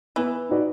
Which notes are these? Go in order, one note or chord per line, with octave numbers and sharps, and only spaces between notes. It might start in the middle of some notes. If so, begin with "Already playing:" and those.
E3 B3
D#4 F#4 B4 D5